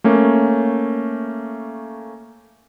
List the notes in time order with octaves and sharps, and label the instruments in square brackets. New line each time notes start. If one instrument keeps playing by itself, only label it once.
[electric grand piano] A3 A#3 C#4